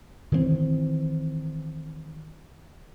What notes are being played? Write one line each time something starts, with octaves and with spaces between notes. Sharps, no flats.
D#3 E3 G3 C4